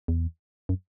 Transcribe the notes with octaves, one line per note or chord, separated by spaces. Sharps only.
E2
F#2